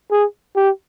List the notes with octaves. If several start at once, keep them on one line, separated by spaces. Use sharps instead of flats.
G#4
G4